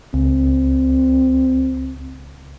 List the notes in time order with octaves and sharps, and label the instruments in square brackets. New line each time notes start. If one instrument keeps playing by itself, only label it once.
[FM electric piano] C#2 [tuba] C4